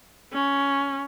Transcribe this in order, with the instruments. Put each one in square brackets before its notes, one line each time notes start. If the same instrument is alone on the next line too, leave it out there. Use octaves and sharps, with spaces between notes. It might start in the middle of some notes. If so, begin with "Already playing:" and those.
[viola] C#4